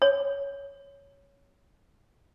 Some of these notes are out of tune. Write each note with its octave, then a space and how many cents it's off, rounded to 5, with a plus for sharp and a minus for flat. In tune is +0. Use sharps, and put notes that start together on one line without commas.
C#5 +10